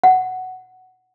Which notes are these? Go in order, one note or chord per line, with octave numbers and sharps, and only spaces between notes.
F#5